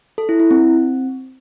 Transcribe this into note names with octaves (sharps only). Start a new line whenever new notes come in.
A4
E4
E4
C4